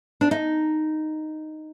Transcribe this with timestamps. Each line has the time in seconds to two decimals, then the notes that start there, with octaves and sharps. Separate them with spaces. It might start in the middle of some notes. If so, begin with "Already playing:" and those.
0.21 D4
0.31 D#4